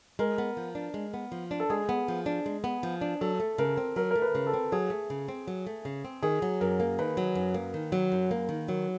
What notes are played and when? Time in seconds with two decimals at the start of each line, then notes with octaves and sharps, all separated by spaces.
0.19 G#3 A#4
0.38 B3
0.57 F3
0.75 D4
0.94 G#3
1.14 B3
1.32 F3
1.51 D4
1.60 A4
1.70 G#3 G#4
1.89 B3
2.08 F3
2.26 D4
2.46 G#3
2.64 B3
2.83 F3
3.01 D4
3.21 F#3 A4
3.40 A3
3.58 C#3 A#4
3.77 C4
3.96 F#3 A#4
4.11 A3 A#4
4.22 B4
4.35 C#3
4.47 A4
4.54 C4
4.72 F#3 G#4
4.90 A3
5.10 C#3
5.28 C4
5.47 F#3
5.67 A3
5.85 C#3
6.05 C4
6.22 D#3 G#4
6.42 F#3
6.61 F#2 A#4
6.80 A#3
6.99 D#3 B4
7.17 F#3
7.35 F#2
7.54 A#3
7.74 D#3
7.92 F#3
8.12 F#2
8.31 A#3
8.49 D#3
8.68 F#3